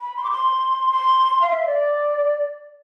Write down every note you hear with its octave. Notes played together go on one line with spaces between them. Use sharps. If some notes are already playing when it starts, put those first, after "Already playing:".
B5
C6
D6
C6
C6
F5
E5
E5
D5